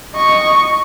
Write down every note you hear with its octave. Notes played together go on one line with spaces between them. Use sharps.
D#5 C#6